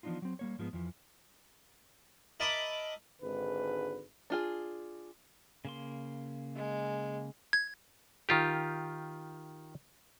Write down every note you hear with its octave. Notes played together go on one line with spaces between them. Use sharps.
E3 F3 B3 D4 D#4 F4
F#3 C4
G3 A#3 C#5
G#2 F3 G#3 B3
F2 E3 F3
A#4 D#5 E5 A5 B5 D6
G#1 G#2 D3 B4
D4 F4 G#4
C#3 A#3 C6
G#3
G#6
D#3 F4 G4